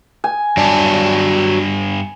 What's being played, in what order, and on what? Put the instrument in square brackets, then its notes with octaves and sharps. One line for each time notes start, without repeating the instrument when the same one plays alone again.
[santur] G#5
[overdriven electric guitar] G2 B3 [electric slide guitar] F#3 D5 A5